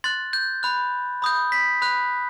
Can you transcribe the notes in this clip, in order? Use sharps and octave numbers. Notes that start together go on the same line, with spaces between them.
C6 F#6 A6
G6
B5 F#6
B5 D#6 G6
B6
B5 F#6